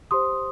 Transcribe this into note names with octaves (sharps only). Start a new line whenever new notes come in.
G4 C5 C6 D#6